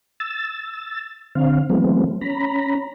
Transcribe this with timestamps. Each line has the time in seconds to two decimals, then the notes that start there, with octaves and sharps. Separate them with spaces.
0.20 E6 A6
1.35 D3 C4 F5
1.70 E3 F#3 G#3 A3 B3 C4
2.21 C#4 A#5 B5